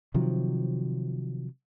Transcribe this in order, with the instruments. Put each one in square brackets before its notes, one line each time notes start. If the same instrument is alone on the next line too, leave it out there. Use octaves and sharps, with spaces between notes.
[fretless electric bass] C3 D#3 F3 F#3